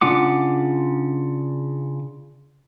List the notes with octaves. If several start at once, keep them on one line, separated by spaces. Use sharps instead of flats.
C#3 D4 F4 F#5 D6